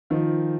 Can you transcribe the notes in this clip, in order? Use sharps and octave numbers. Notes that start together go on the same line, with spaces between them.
D#3 F3